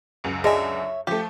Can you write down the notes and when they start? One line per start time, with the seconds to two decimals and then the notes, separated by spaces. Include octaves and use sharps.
0.24 C#2 F#2
0.44 D3 G#4 C#5 D#5 E5 G#5
1.07 F3 A3 G4